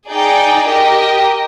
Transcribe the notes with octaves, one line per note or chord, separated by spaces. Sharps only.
D#4 G#4 D5 G5
G4 A#4 D#5 G5